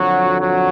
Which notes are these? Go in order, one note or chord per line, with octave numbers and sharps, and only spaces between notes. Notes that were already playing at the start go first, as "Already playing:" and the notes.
Already playing: F2 D3 F3 F#3 F#4
F#3 F#4